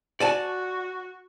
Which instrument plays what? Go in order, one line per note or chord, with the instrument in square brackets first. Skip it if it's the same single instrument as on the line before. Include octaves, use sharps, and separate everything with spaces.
[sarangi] F#4 [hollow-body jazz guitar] D5 G#5 A5